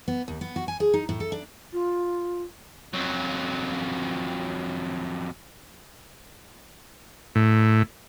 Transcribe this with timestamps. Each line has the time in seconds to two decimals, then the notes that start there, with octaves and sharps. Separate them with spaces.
0.08 B3
0.28 D#2
0.41 B3
0.56 F#4
0.68 G#5
0.80 G#4
0.94 D#4
1.09 A2
1.20 A4
1.32 D4
1.73 F4
2.93 F2 F#3
7.35 A2